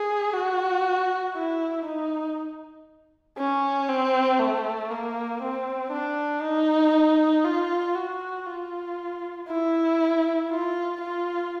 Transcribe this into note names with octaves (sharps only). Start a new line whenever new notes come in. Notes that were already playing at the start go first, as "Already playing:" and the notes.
Already playing: G#4
F#4
E4
D#4
C#4
C4
A3
A#3
C4
D4
D#4
F4
F#4
F4
E4
F4
F4